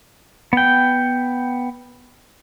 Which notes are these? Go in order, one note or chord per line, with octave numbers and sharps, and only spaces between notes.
B3 G5